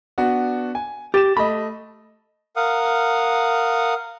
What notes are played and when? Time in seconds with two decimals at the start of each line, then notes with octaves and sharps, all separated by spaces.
0.18 B3 D4 F#4
0.75 G#5
1.14 G4 A6 E7
1.37 A3 D#5 B5
2.56 A#4 F5 F#5 D#6